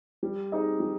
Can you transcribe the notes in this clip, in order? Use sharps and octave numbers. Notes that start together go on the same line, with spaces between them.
G3
C4 D#4 G#4 D#5
G3